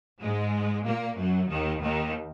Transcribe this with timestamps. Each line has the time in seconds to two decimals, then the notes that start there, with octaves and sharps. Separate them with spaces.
0.21 G#2 G#3
0.86 A#2 A#3
1.18 F#2 F#3
1.51 D#2 D#3
1.82 D#2 D#3